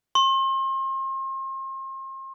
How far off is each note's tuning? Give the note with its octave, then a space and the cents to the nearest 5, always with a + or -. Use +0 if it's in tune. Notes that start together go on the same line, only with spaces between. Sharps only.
C6 +40